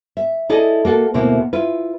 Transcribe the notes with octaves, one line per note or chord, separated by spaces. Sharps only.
E5
E4 G#4 A4 D5 D#5
A#3 F#4 A4
D2 B2 A#3 C4 E4
E4 F4 B4